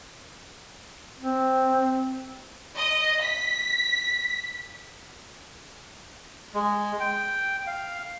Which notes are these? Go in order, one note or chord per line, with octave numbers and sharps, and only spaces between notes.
C4
D#5
B6
G#3
G5
F5